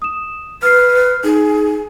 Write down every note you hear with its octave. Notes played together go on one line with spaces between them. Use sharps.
D#6 E7
B4 F6 C7
D#4 G#4